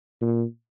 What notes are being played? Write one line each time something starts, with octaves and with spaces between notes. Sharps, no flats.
A#2